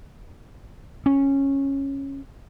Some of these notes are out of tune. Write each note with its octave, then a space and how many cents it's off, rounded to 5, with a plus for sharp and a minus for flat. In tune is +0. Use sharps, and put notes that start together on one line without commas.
C#4 -10